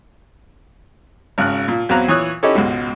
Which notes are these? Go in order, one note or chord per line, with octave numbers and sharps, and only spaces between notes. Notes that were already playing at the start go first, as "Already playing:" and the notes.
G#1 C#3 F6 F#6
A#2
E2 F#3 C4 F5 A#5 F#6
A#2 E3 C#5 D#6 F#6
C#4 D#4 E4 G4 A4 C#5
C#2 G#2 B2